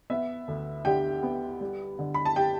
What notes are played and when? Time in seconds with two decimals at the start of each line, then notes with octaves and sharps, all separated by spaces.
0.10 B3 E5
0.48 D2
0.85 D3 G4 G5
1.23 B3
1.61 G3
1.99 D3
2.14 B5
2.25 A5
2.36 G4 G5